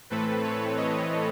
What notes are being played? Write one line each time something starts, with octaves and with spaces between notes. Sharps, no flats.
A2 E3 A3 C4 A4 B4
B4 C#5
C#5 D#5